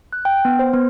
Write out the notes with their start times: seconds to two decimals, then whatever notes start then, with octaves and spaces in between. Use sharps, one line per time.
0.13 F#6
0.25 G5
0.45 B3
0.59 C5
0.73 B3